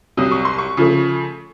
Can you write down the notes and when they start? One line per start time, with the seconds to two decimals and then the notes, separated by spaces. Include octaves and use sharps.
0.17 C2 C3 F#3 D#6
0.31 C#6
0.45 C6
0.58 C#6
0.77 C#3 F3 A3